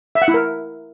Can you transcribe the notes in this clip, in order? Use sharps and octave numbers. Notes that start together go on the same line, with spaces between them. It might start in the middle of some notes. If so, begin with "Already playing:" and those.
E5
F#5
E4
A#4